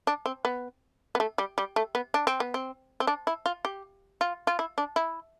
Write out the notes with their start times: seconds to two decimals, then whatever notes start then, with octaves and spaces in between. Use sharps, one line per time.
0.07 D4
0.26 C4
0.45 B3
1.15 B3
1.20 A3
1.38 G3
1.58 G3
1.76 A3
1.95 B3
2.14 D4
2.27 C4
2.40 B3
2.54 C4
3.00 C4
3.07 D4
3.27 E4
3.46 F4
3.65 G4
4.21 F4
4.47 F4
4.59 E4
4.78 D4
4.96 E4